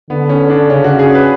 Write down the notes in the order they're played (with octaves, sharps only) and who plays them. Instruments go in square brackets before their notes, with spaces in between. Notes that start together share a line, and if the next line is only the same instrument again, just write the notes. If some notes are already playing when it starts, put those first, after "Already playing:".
[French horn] D3 [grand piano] B3
[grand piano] C#4
D4
[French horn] C#3 [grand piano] C#4
[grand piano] F#4
G#4
B4